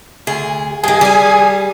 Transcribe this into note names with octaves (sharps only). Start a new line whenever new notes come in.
D2 G#4
G2 D#3 G#4
G3 G#5